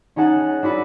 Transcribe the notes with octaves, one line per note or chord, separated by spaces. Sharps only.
C#4 D#4 G#4 F#5 A5
D4 E4 F#4 B4